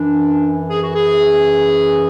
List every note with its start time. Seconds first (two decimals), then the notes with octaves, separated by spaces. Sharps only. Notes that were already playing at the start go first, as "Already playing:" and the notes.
Already playing: F#2 E3 D4
0.69 G#4
0.82 F#4
0.95 G#4